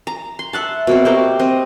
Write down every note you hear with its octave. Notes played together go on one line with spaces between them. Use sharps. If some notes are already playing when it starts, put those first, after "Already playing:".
A#5
C6
E5 F#5 A5
B2 A#3 C4
C4 G4 A#4
C4 D#5